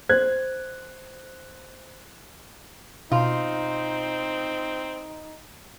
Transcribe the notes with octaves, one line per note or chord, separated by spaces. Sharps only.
C5 F#6 G#6
B2 C4 D#4 F4